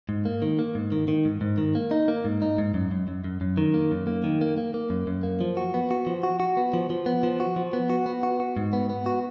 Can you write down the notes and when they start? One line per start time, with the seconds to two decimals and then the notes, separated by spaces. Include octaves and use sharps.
0.09 G#2
0.25 A#3
0.42 D#3
0.59 A#3
0.75 G#2
0.92 D#3
1.08 D#3
1.25 G#2
1.41 G#2
1.58 D#3
1.75 A#3
1.91 D#4
2.08 A#3
2.25 G#2
2.42 D#4
2.58 G#2
2.74 F#2
2.91 F#2
3.08 F#2
3.24 F#2
3.41 F#2
3.57 D#3
3.74 A#3
3.91 F#2
4.07 A#3
4.24 D#3
4.41 A#3
4.57 A#3
4.74 A#3
4.90 F#2
5.07 F#2
5.23 A#3
5.41 F3
5.57 F#4
5.74 B3
5.91 F#4
6.07 F3
6.23 F#4
6.40 F#4
6.57 B3
6.73 F3
6.90 F3
7.06 B3
7.23 F3
7.40 F#4
7.56 F3
7.73 B3
7.90 F#4
8.06 B3
8.23 F#4
8.40 F#4
8.57 G#2
8.73 B3
8.90 B3
9.06 F#4